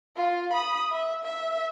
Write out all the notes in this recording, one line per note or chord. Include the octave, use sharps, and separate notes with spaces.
F4
B5 D#6
E5
E5